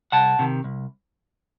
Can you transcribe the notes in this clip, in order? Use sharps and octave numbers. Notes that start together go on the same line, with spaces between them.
C2 F#5 A5
C3 D#3
C2